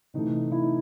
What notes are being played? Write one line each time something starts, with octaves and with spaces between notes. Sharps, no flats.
C3 E3 A3 D#4
E4
D#4